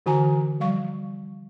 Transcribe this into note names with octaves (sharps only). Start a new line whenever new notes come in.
D3 E3 F#4 A#4 G#5 A#5
F3 G3 F5 C#6